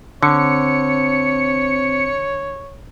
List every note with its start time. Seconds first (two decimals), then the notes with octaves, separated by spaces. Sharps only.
0.23 D3 C4 C#5 C#7